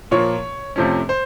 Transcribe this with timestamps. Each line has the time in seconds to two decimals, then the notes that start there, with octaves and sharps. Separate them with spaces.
0.11 A#2 F3 A#3 C#5
0.76 F2 C3 F3 A3 C#4
1.09 C5